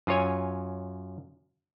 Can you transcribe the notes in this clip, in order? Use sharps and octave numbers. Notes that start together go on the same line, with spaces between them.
F#2 F4 C#5 G#5